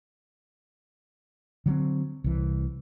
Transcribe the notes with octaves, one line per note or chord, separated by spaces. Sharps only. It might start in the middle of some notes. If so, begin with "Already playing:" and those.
D3 F#3 G3 C4
C2 E3